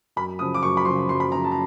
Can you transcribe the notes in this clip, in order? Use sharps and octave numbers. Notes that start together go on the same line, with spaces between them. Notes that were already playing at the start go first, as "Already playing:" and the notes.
F#2 B5
C#3 F3 D#6
D6
F#2 C#6
B5
C#3 F3 C6
F#2 C6
B5
C#3 F3 A#5
A5
A#5